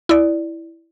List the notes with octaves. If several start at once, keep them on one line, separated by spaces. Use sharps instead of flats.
E4 D5